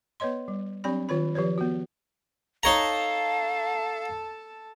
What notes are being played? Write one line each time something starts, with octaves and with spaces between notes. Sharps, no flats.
B3 B4 C#5 D#5 C6
G3
F#3 C4 D4 G4 D5 B5
D#3 F4 C#5 B5
F3 G4 B4 C#5 D5
B3 F#4
D#4 A4 C#5 F5 A5 A#5